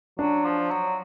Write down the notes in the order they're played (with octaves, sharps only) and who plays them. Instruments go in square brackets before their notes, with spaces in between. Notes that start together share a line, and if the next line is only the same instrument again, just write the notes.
[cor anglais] F#3 [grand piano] D4
[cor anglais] F3
F#3